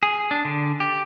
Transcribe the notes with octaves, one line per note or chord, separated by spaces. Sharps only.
G#4
D4
D3
G4